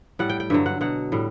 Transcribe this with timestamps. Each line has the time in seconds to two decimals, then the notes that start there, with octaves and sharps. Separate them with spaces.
0.19 A2 G3 F#5
0.30 G5
0.40 G5
0.50 G2 D3 F#3 E5
0.66 F#5
0.81 B2 F#3 F#5
1.12 A2 G3